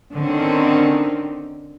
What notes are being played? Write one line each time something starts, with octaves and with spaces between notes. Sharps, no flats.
D3 D#3 C4 C#4